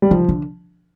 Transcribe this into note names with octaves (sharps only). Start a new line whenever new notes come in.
G3
D#3 F3
D3